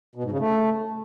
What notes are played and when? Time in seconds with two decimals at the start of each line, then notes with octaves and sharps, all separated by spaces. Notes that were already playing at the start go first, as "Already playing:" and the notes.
0.15 B2
0.23 G#2
0.31 C#3
0.40 A3